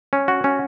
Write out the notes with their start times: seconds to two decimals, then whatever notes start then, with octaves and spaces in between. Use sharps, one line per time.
0.13 C#4
0.28 F#4
0.44 C#4